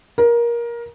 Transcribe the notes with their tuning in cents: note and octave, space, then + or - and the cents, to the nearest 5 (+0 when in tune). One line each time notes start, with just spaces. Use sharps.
A#4 +20